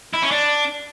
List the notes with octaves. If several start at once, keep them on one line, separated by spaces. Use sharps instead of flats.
E4
C#4
D4